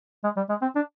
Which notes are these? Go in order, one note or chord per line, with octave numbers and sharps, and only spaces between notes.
G#3
G3
G#3
C4
D4